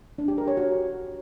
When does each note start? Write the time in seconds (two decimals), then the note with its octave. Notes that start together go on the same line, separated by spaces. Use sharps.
0.18 D4
0.28 G4
0.38 A#4
0.48 C#5
0.57 F#4